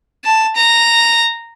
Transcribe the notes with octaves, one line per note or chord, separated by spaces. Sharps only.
A5
A#5